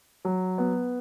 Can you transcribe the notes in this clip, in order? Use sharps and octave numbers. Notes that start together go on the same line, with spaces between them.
F#3
B3